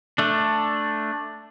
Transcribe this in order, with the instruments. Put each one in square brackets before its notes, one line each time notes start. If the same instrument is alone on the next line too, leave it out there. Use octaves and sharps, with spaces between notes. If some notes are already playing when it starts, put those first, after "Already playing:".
[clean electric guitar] A3 D4